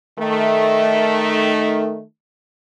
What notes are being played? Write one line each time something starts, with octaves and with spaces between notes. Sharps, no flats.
D#3 A3